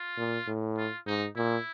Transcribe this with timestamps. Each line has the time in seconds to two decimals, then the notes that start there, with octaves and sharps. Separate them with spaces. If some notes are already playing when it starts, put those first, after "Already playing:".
Already playing: F4
0.17 A#2
0.47 A2
0.77 F4
1.07 G#2 D#4
1.36 A#2 E4